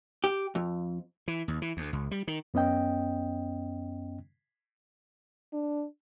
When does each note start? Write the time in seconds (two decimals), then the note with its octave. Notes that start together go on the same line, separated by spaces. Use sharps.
0.24 G4
0.55 F2
1.28 E3
1.48 D#2
1.62 E3
1.77 D2
1.93 C#2
2.11 G3
2.28 D#3
2.54 F#2 B3 C#4 D#5 G5
5.53 D4